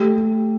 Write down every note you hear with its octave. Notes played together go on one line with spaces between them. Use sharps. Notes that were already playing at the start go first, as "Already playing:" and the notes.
Already playing: A3 G4